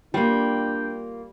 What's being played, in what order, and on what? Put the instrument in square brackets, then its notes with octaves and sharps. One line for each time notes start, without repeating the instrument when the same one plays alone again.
[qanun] G3 [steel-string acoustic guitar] A#3 F4 [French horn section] D4 [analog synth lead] G5